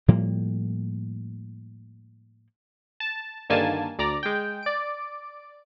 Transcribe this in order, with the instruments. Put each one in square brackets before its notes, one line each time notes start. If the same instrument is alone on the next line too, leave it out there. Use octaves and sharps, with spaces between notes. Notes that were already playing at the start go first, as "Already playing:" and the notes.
[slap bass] A2 F3 G3 A#3
[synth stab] A5
G2 D3 D#3 A#3 G#5 A5
D2 D5 A#5
G#3 G5
D5 D7